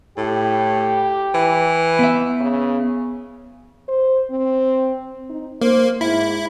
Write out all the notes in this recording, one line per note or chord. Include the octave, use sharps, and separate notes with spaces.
A2 G4
E3
B3 E5
C#3
C5
C4
D#4
A#3 C5
G#2 E4